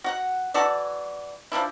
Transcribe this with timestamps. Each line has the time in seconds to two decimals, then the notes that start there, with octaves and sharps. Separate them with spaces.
0.04 F#4 F#5
0.54 E3 F#4 A4 D5
1.52 F3 F#3 D4 E4